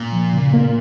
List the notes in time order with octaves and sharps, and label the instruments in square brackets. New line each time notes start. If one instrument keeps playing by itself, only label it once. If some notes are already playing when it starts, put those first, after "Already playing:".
Already playing: [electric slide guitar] A#2
[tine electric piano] F3
C#3
A#3